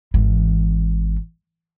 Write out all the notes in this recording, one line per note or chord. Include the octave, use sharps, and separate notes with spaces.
G#1 E3